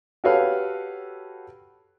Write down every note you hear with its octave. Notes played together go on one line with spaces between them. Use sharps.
F#4 G4 A4 B4 C#5 F5